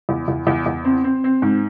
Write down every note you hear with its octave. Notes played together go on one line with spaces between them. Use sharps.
E2
E2
E2
E2
C4
C4
C4
G#2